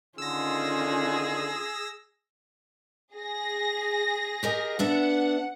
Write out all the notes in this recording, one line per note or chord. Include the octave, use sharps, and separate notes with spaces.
D3 D#3 C#4 F4 G#4 E6 A#6
G#4 A#6
G4 A#4 D#5
B3 D4 E5 F#5